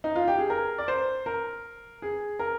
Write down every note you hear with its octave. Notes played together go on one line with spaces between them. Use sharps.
D#4
F4
G4
G#4
A#4
D5
C5
A#4
G#4
A#4